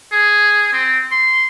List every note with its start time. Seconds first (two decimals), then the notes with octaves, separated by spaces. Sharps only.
0.12 G#4
0.73 C4
1.11 C6